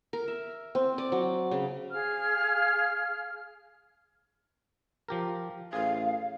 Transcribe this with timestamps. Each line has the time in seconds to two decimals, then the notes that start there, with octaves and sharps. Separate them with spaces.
0.13 A#4
0.28 E5
0.75 C4
0.98 D5
1.12 F#3
1.51 C#3
1.92 G#4 F5 F6
5.08 F3 G4 A#4
5.73 A1 G#4 F5